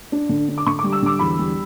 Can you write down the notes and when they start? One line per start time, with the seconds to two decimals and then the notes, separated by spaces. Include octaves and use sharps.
0.12 D4
0.29 D3
0.48 D4
0.58 D6
0.66 D3 C#6
0.79 G3 D6
0.92 E6
1.02 D3 D6
1.19 E2 B5
1.39 G3